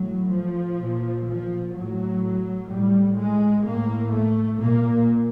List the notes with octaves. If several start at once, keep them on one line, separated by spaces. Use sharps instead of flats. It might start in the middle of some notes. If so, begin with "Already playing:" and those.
Already playing: A2 F#3
F3
A#2
F3
A2 F#3
A2 G3
G#3
A2 A#3
A3
A#2 A#3